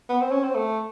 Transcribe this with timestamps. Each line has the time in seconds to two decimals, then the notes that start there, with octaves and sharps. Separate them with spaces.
0.09 B3
0.21 C4
0.32 C#4
0.44 C4
0.55 A3